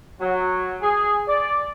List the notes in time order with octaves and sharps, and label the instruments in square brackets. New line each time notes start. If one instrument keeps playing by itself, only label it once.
[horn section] F#3
G#4
D5